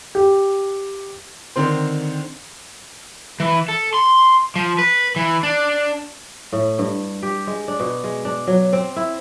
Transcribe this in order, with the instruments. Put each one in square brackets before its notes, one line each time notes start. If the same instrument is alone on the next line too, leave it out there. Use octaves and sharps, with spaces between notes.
[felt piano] G4
[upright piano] D3 D#3 C4 C5
[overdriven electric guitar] E3
A4
C6
F3
B4
E3
D4
[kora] A2
G2
G4
G#3
D4
B2
G#3
D4
F#3
C4
E4